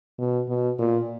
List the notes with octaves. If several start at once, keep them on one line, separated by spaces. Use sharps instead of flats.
B2
B2
A#2